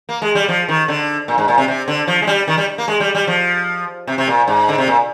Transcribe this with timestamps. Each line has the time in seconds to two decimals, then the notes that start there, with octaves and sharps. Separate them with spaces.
0.09 A#3
0.22 G#3
0.35 G3
0.48 F3
0.68 D#3
0.88 D3
1.28 A#2
1.38 G#2
1.48 A#2
1.58 C3
1.68 C3
1.88 D3
2.07 F3
2.22 G#3
2.27 G3
2.48 D#3
2.58 G3
2.78 A#3
2.88 G#3
3.00 G3
3.15 G3
3.27 F3
4.07 C3
4.18 C3
4.28 A#2
4.48 G#2
4.68 D3
4.78 C3
4.87 A#2